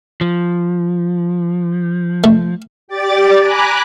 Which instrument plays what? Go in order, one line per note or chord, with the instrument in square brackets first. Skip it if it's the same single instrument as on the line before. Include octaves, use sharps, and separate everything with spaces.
[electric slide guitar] F3
[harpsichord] A3
[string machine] G4 D5 D6 A6
G#5 A#5 B5 D6 F#6